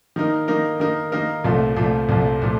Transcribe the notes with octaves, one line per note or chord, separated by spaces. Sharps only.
D#3 A#3 D#4 A#4
D#3 A#3 D#4 A#4
D#3 A#3 D#4 A#4
D#3 A#3 D#4 A#4
C2 A#2 F3 A3
C2 A#2 F3 A3
C2 A#2 F3 A3
A#2 F3 A3